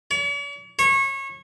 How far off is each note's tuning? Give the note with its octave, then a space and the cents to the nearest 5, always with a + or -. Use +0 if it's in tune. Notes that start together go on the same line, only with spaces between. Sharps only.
C#5 +45
C#5 -25